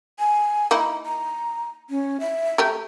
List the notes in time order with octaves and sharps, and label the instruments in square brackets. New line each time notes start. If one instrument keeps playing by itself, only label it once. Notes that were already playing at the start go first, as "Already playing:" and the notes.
[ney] G#5
[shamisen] A#3 D#4 E4 [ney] A#5
[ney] A#5
C#4
E5
[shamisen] A3 G4 A#4